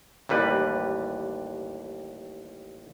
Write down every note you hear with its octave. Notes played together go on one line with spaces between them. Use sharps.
A1 D#2 G3 B4